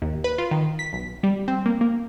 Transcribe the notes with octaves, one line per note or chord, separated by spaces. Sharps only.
D#2
B4
F4
D#3
B6
B1
G3
C4
A#3
A#3